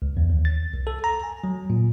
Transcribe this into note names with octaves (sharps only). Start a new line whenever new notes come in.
C#2
E2
D#2
A6
C2
A4
A#5
G#5
F#3
A#2